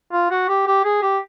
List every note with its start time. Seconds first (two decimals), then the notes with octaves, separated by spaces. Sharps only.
0.12 F4
0.31 F#4
0.48 G4
0.67 G4
0.85 G#4
1.02 G4